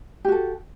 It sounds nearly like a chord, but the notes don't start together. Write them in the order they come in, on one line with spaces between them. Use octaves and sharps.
G4 F#4 A4